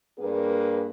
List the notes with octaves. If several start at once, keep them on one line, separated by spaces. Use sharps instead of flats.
G2 A#3 G#4 B4